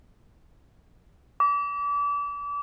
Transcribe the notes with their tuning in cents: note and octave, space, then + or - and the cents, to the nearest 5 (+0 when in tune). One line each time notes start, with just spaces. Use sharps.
D6 -35